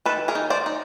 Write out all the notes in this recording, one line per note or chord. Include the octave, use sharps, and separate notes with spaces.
D#3 A4 B4
G#4 A#4
D#4
C5 D5
D#4